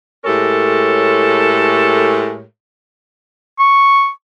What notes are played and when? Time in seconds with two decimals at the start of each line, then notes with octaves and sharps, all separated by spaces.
0.25 A2 G#3 G4 A4 A#4 C#5
3.59 C#6